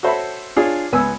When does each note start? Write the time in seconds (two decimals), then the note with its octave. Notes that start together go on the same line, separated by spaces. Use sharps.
0.03 F#4 A4 C5 C#5 E5 B5
0.56 D4 F4 G#4 C#5
0.92 C#2 B3 G#5 E6